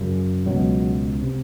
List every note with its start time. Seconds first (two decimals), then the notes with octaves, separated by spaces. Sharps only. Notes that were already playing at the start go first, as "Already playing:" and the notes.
Already playing: F#2 C#3
0.46 C#2 B2 F#3
1.22 C3